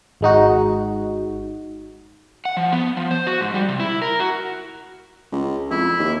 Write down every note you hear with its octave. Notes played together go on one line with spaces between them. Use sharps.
G#1 G#3 D#4 F#4
F#5
F3
B3
F3
C5
F#4
G#2
G3
C3
E4
A#4
F#4
C#2
F2 E4
D#2